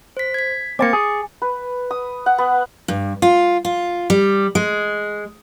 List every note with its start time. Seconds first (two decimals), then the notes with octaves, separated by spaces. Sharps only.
0.17 C5 B6
0.34 G#6 B6
0.79 A#3 C4 D6 A6 C#7
0.93 G#4
1.42 B4
1.91 D#6
2.26 F#5
2.38 B3
2.88 G2
3.22 F4
3.65 F4
4.10 G3
4.55 G#3